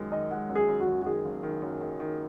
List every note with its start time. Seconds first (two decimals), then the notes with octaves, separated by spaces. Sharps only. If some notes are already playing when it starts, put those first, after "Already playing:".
Already playing: F#2 D#3 G#3
0.12 D#3 D#5
0.31 G#3 F#5
0.49 F#2
0.55 G#4
0.68 F#2
0.80 F#4
0.87 F#2
1.02 F#4
1.06 D#3 G#4
1.25 F#1
1.43 D#3
1.62 F#2
1.81 D#3
2.00 D#3